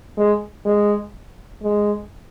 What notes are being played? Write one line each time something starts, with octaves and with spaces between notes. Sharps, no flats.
G#3
G#3
G#3